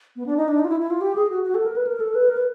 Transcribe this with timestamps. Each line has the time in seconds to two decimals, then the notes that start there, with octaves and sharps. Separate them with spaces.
0.16 B3
0.26 D4
0.37 D#4
0.48 D4
0.59 D#4
0.64 F4
0.69 E4
0.80 E4
0.90 F4
1.01 G4
1.15 G#4
1.30 F#4
1.44 F#4
1.55 A4
1.66 A#4
1.76 B4
1.87 A#4
2.00 A4
2.15 B4
2.29 A#4
2.37 B4